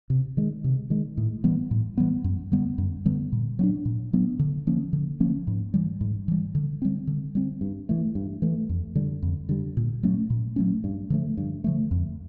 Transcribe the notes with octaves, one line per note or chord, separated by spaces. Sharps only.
C3
D#3 G#3
C3
D#3 G#3
A2
E3 G3 B3
A2
E3 G3 B3
F#2
D3 G3 B3
F#2
D3 G3 B3
A#2
F#3 B3 D4
A#2
F#3 B3 D4
D3
F3 A#3 C#4
D3
F3 A#3 C#4
G#2
E3 G3
G#2
E3 G3
D3
G3 C4
D3
G3 C4
G2
E3 A3
G2
E3 A3
F2
D3 G3
F2
D3 G3
A#2
F#3 A3 C#4
A#2
F#3 A3 C#4
G2
D3 F3 A3
G2
D3 F3 A3
F2